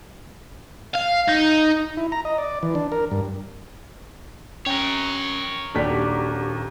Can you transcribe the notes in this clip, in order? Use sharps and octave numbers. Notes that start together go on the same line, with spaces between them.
F5
D#4
E4
A#5
D#5
D5
E3
D4
A#4
G2
C#4 A#4 C#5 G5
D#1 D#2 D4 F#4 G4 D5 B6